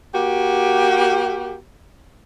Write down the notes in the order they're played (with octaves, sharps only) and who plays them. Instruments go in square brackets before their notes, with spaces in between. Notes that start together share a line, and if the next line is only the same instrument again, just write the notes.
[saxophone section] A#3 F#4 G4